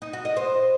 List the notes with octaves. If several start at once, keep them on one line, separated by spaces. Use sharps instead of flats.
D#4
F#4
D#5
C5